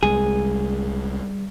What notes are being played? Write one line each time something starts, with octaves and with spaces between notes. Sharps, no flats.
C2 G3 G#3 G#4